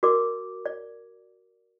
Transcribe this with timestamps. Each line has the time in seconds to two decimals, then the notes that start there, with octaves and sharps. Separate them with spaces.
0.03 F#4 A#4 D5 D6
0.66 D5